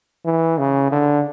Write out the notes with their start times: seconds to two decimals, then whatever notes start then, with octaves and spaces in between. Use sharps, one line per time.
0.25 E3
0.58 C#3
0.92 D3